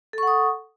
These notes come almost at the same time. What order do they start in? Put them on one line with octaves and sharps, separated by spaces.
A4 C#6 F#5 D#6